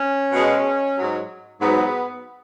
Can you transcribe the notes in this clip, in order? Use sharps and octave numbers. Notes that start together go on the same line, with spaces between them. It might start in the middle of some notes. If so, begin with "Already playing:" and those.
Already playing: C#4
B2 G#3
G#2 F#3
G#2 F#3 B3